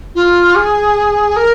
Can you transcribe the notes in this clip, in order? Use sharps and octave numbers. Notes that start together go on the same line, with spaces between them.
F4
G#4
A#4